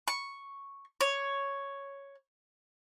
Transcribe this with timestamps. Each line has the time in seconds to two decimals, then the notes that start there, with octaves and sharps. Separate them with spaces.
0.08 C#6
1.01 C#5